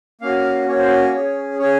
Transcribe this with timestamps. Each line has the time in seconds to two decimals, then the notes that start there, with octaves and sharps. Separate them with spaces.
0.21 A#3 C#4 F#4 F5
0.68 A#3 C#4 F#4 C#5
0.78 C5
0.88 C#5
1.14 C#4 G#4
1.59 C#4 G#4 C#5